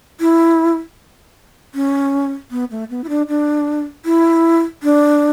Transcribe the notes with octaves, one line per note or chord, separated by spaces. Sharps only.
E4
C#4
B3
A3
B3
E4
D4
D4
E4
D4